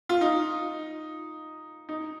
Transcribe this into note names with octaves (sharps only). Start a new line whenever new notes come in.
F4
D#4
D#4